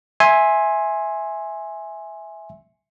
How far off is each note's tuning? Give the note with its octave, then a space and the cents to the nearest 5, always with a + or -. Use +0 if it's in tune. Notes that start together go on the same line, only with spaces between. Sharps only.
E5 -5 G#5 +0 C6 +15